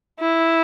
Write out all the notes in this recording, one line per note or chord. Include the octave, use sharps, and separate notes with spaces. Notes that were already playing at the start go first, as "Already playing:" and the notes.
E4